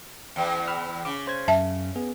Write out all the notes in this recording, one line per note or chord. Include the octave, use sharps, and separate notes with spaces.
E2
B5 E6 F6
C#3 D6
C5 C#5 G#6
F#2 E5 A5
B3 G#4